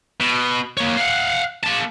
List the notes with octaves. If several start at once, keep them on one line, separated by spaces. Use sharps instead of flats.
B2
A#3 C#5
F5 F#5
A#3 A5